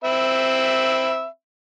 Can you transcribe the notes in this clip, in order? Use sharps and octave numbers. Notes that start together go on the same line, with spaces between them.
C4 E5 B5